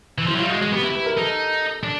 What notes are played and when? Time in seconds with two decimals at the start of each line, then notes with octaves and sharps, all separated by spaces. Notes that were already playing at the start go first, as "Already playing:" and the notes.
0.18 E3
0.27 F3 E4
0.35 F#3
0.39 G3 F4
0.49 G#3 F#4
0.61 G#3 F#4
0.72 B3 G4
0.84 E4
0.95 B4
1.06 A#4
1.17 D#4 A4
1.83 D4